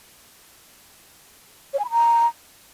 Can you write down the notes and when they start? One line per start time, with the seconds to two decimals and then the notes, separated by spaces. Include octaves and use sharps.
1.73 C#5
1.79 G#5
1.85 B5
1.90 A#5